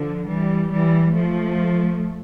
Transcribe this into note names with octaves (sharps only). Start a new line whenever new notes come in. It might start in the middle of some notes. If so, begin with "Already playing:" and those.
Already playing: D3 F3
E3 G3
E3 G3
F3 A3